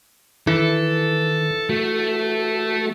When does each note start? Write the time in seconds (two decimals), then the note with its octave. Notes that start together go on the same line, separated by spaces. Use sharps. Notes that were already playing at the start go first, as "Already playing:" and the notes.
0.47 D#3 E3 A4
1.70 A3 F#4 A4